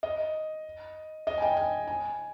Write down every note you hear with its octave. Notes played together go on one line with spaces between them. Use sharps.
D#5
D#5
G#5
G5
G#5
G#5